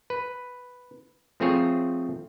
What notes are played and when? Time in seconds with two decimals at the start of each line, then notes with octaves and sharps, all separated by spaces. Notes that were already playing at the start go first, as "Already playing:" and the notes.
0.10 B4
1.40 F3 A3 C4 F4 G#4 C#5